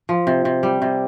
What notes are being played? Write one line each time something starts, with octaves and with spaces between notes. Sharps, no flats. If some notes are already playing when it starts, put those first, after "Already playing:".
F3
C3
C3
G3
C3